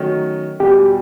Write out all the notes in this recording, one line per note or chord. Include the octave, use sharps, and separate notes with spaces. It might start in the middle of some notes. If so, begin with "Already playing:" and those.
Already playing: D#3 F#3 A3 C#4
E2 B2 G3 G4